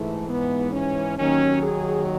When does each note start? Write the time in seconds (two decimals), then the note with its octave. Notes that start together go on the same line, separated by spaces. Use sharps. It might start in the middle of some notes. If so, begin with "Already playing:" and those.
Already playing: G#2 E3 A3
0.29 B3
0.73 C#4
1.18 D#2 D#3 F#3 C#4
1.62 G#4